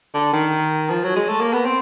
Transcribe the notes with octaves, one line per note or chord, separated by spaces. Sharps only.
D3
D#3
F3
F#3
G#3
A3
A#3
B3
C4